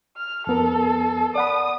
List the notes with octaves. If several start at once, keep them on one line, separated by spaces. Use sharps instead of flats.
F6
F2 B3 A4 A#4
D5 F#5 B5 D#6